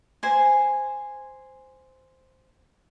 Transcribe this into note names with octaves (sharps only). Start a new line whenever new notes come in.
C5 G#5